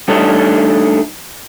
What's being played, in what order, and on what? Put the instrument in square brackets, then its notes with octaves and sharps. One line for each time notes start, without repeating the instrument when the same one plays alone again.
[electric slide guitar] G3 A3 D4 D#4 C#5